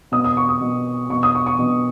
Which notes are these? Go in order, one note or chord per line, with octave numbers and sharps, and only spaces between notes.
B2 D#6
D#6
C#6
D#6
B2
B2 C#6
D#6
C#6
C#6
B2